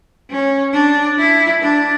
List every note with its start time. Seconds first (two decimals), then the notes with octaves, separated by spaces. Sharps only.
0.30 C#4
0.73 D4
1.18 E4
1.61 D4